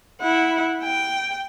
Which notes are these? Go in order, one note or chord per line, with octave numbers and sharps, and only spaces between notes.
E4 F#5
G5